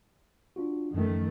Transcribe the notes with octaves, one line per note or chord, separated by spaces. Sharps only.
D4 F4 F#4
F#2 D#3 F3 A3